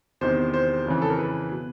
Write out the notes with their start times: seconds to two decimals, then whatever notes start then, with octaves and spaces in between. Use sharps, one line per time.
0.21 E2 C3 D#3 C5
0.54 C5
0.86 F2 C#3 E3
1.02 A4
1.10 A#4
1.19 B4
1.51 B2